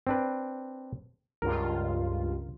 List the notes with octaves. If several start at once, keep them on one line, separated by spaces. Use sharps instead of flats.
C4 D4 B4
C#2 G2 F4 A#4